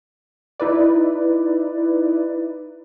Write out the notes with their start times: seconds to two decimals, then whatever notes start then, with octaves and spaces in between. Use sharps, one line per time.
0.60 D#4 E4 B4 D5